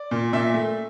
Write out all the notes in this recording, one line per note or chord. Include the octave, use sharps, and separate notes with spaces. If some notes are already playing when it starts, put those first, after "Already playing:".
Already playing: D5
A#2
A#2 E5
A3